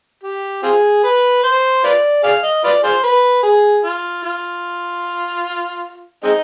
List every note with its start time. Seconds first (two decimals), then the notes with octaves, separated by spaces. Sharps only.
0.23 G4
0.63 C4 F4 G#4
1.04 B4
1.44 C5
1.84 F4 B4 D5
2.23 G#4 D5 F5
2.44 D#5
2.64 F4 B4 D5
2.84 F4 G#4 C5
3.03 B4
3.43 G#4
3.84 F4
4.23 F4
6.23 G#3 C4 D#4